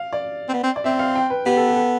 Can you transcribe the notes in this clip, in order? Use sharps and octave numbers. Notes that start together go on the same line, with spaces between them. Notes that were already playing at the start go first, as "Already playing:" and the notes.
Already playing: F5
D5
C4
B3
C4
D5
C4 E5
F5
G5
B4
B3 G4
A4
G4
A4